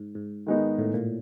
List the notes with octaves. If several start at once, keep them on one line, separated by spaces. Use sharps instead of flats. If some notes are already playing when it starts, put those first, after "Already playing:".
Already playing: G#2
G#2
D#3 G#3 B3 D#4
A2
A#2